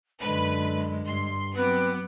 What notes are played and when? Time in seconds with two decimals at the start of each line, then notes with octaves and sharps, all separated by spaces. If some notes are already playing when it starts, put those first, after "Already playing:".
0.22 F#2 D3 G#3 B4
1.07 G2 C6
1.56 F#3 B3 C4 B4 D6